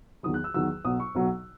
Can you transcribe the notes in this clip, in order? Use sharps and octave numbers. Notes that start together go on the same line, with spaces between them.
E2 D#3 F#3 D#6
F#6
E6
E2 D#3 F#3 E6
B1 B2 F#3 D#6
C#6
B1 B2 F#3